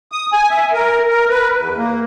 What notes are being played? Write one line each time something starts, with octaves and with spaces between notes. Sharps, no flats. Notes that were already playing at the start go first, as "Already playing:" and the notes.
D#6
G#5
E5
A#4
A#4
B4
E2
A#3